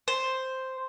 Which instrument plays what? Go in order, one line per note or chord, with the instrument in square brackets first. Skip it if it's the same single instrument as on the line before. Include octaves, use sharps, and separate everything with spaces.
[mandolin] C5